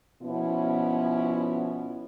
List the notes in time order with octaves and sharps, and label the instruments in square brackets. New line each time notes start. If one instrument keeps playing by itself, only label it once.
[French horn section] B2 F3 B3 C#4 E4